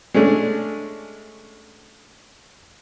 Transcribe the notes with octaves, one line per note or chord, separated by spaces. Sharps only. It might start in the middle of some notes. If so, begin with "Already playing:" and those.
G#3 A3 C#4 D4